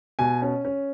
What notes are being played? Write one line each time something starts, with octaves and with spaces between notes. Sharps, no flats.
B2 G#5
C#4
C#4